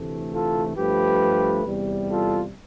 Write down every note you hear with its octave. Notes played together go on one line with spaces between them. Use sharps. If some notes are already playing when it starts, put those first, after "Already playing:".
Already playing: D2 C3 E3 A3
F4 A4
G2 F3 A3 G4 B4
E2 C3 G3
F4 A4